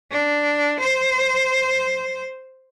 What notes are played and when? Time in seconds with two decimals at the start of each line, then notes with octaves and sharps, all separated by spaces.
0.11 D4
0.80 C5